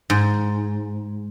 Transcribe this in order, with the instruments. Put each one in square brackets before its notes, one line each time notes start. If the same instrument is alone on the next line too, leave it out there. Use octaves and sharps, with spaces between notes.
[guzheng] G#2